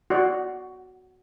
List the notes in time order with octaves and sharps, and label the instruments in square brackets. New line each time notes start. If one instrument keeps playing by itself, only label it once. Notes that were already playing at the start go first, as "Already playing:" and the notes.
[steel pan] F#4 D5